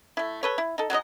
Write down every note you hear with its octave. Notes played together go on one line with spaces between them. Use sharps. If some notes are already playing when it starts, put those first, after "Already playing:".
A3 E4
A4 B4 C#5
E4
D#4 A4
F#3 G#3 D#4 D#5